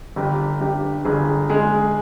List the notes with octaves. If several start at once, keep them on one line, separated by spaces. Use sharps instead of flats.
G1 G4
G2 G4
G1 G#4
G#3 G#4